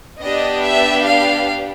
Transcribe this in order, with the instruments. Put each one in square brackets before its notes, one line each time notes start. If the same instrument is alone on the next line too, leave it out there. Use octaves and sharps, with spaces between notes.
[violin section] B3 D4 G4 D#5
E5
F5